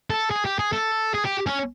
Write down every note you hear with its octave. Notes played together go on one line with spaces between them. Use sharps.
A4
G#4
G4
G#4
A4
G#4
G4
C#4